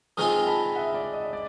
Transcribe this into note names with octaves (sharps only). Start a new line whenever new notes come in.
D#3 G#3 C4 F4 G#4 D#6 F6
A5 B5
E5 F#5
D5
D#5
D5